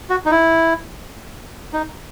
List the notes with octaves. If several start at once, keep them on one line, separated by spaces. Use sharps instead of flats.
F#4
D#4
E4
D#4